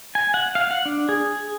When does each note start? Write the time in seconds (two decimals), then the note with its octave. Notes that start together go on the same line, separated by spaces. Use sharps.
0.15 G#5
0.34 F#5
0.55 F5
0.71 F#5
0.85 D4
1.09 G#4